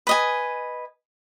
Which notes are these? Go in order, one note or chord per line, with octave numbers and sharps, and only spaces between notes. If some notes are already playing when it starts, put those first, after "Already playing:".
B4 D#5 G#5